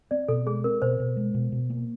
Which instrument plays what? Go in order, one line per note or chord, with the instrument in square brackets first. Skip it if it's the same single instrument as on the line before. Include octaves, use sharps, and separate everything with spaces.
[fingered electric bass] C4 [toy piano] D5
[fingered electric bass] B2 [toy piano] A4
[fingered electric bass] G#3 [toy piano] G#4
[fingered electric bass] C4 [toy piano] A#4
[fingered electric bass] B2 [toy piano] C5
[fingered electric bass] B2
G#3
B2
B2
A#3